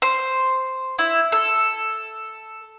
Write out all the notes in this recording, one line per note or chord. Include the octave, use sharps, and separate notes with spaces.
C5
E4
A4